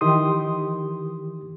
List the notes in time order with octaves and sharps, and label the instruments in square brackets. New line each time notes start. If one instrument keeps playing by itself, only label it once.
[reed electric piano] D#3 E3 G4 C6 D#6